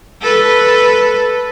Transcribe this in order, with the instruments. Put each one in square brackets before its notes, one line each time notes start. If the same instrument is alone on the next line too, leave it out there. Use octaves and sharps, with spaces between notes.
[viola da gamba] A4 B4